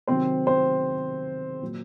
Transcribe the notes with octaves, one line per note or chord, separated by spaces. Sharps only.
C3 D#3 F#3 C4 C5
C4 C5
A#2 F#3